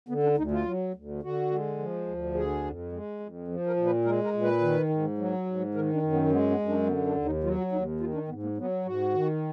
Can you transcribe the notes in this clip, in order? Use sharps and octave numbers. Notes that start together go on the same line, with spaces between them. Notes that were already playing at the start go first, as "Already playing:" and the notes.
D3 B3
D4
D2 D#4
F4
F#3
D2
D3 F#4
G#3
F3
D2
D3 G#4
F2
G#3
F2
F3
A#4
A#2
B4
G#3 A#4
A#4
A#2
B4
D#3
G#2
F#3
G#2
D#3 A#4
D4
F#2
B3
G#3 B3
B3
F#2
D4
D3 B3
D4
D#2
D#4
F#3 F4
F#4
D#2 D#4
D#3 F4
D4
G#2 B3
A#3
F#3 B3
G#2 F#4
D#3